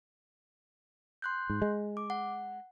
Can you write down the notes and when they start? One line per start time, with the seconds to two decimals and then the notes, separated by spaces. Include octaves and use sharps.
1.22 C6 F#6 G6
1.50 G#2
1.62 G#3
1.97 D6
2.10 F#5